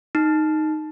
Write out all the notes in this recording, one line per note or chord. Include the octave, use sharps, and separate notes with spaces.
D#4